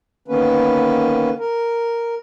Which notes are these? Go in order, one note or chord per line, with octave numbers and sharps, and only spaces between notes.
D3 D#3 A#3 B3 C#4 B4
A#4